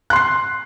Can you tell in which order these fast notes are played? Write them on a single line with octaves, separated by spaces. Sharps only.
F#6 C6 C7